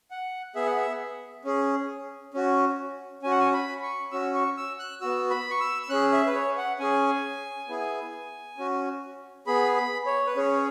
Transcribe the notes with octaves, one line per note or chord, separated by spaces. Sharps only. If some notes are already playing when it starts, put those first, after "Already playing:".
F#5
B3 G#4 E5
F#5
E5
C#4 G#4
C#4 F#4
C#4 F#4 G#5
F#5
G#5
B5
C#6
C#4 F#4 E6
C#6
E6
F#6
B3 F#4 E6
B5
C#6
E6
E6
C#4 G#4 F#6
E5
B4
C#5
F#5
C#4 G#4 G#5
B3 E4 G#4
C#4 F#4
B3 G#4 B5
B5
C#5
B4
C#4 G#4 C#5